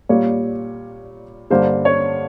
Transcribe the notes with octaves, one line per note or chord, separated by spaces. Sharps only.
A#2 G3 A#3 C#5
G2 D3 G3 A#3 C5
C#5